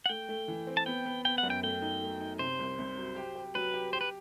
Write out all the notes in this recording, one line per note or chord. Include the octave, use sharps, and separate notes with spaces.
F#5
A3 G5
A3
E3
C4
A5
B3 G5
B3
B3 G5
F#5
F#2
G5
A3 G5
D#4
A3
D#4
C3 C5
C2
C2
F#3
G4
G4
F#3 B4
G4
G4 C5
B4